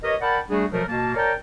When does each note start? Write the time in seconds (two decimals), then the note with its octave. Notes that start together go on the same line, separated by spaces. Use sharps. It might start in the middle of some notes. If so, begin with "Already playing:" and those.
0.03 G4 A#4 B4 C#5 D#5
0.21 A#4 D5 F#5 G5 A5 B5
0.49 G3 A3 D4 F#4 G#4
0.72 B2 F3 F#3 A3 A#4
0.88 B2 A#3 A5
1.16 A#4 C#5 D5 G5 A5 A#5